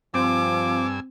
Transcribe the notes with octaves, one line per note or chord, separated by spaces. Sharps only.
G2 F3 C4 G#5 D6 E6